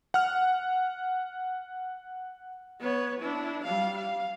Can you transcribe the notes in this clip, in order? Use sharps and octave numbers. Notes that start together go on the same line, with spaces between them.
F#5 F6
B3 C#5
D4 E4
G3 F5
F5